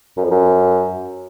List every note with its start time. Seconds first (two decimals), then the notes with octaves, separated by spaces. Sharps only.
0.17 F#2
0.24 F2
0.31 F#2